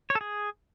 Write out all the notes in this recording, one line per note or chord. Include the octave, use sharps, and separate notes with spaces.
C#5
A4
G#4